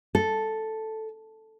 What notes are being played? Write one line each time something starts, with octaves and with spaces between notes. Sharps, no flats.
A4